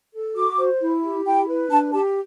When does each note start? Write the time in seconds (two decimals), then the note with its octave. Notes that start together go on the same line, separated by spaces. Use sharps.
0.13 A4
0.36 F#4 D6
0.58 C5
0.81 E4
1.03 G4
1.25 E4 G5
1.48 B4
1.71 D4 A5
1.93 G4 A5